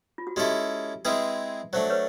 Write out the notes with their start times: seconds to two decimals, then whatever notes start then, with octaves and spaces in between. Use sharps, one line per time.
0.18 F4
0.27 F#4
0.36 G#3 C#4 E4 G4 A4
1.05 G#3 C4 E4 G#4 B4
1.73 F#3 A3 D4 C5
1.90 B4 C#5